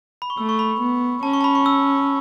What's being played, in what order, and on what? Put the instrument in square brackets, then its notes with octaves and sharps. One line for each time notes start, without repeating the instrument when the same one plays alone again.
[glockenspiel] B5
C#6
[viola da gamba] A3 [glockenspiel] E6
[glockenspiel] C#6
B5
[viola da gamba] B3
[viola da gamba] C#4 [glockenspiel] A5
[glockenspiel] C#6
A5
B5
C#6
E6